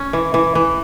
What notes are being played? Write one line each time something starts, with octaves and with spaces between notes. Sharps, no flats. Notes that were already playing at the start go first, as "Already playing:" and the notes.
Already playing: C#4
E3
E3
E3